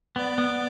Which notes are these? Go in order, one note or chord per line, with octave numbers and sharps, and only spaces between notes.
B3 D5
B3